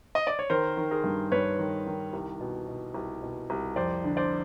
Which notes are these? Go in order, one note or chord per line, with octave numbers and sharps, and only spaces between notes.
D#5
D5
C#5
D#3 A#4 C5
D#3
G#4 A#4
G2
G2 B4 C#5
D#3
D#3
C2
B2
B2
C2
B2
C2
F2 C5 D5
D3
C5 D5